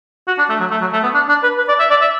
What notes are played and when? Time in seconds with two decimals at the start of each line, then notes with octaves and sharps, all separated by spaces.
0.27 F#4
0.38 D4
0.49 A3
0.60 F#3
0.71 A3
0.81 F#3
0.93 A3
1.04 B3
1.14 D4
1.29 D4
1.43 B4
1.58 B4
1.68 D5
1.79 E5
1.90 D5
2.01 E5